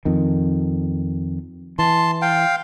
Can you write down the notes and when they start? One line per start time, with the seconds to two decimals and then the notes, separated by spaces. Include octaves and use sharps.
0.05 F2 D#3
1.79 E3 A5 C6
2.22 F5 G5